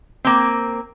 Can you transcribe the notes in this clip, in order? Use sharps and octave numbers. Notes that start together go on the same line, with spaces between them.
A#3 C4